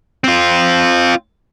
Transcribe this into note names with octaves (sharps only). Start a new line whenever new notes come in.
C4 F4